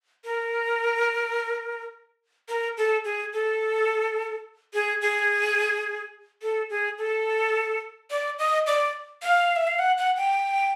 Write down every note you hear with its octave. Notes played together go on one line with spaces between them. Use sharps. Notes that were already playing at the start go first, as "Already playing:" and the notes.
A#4
A#4
A4
G#4
A4
G#4
G#4
A4
G#4
A4
D5
D#5
D5
F5
E5
F5
F#5
F#5
G5